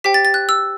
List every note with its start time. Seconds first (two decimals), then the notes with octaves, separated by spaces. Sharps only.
0.04 G4 C5 G5 B6
0.14 A6
0.25 A6
0.34 F#6
0.49 E6